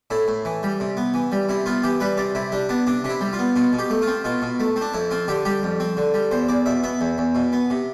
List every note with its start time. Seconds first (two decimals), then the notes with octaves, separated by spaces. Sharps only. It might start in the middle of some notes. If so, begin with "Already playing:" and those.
0.10 A2 E4
0.28 A2
0.45 E3
0.63 G3
0.80 C3
0.97 B3
1.14 E3
1.32 G3
1.49 C3 E4
1.66 B3 F4
1.83 E3 G4
2.00 G3 B4
2.17 C3 D5
2.35 C3 E4
2.52 G3 D4
2.69 B3 D4
2.87 C3 D4
3.04 C3 D4
3.09 E4
3.21 G3
3.33 F4
3.39 B3
3.56 B2 F4
3.73 B2
3.79 G4
3.90 A3
4.02 F4
4.07 C4
4.24 B2 F4
4.42 B2
4.60 A3
4.76 C4
4.81 D4
4.94 F2 E4
5.11 C4 F4
5.28 D3 G4
5.45 G3 G4
5.63 F2
5.80 C4
5.97 D3
6.14 G3
6.31 E2 C5
6.49 E2 D5
6.66 B2 E5
6.84 B3 E5
7.01 E2
7.18 E2
7.35 B2
7.53 B3
7.70 C3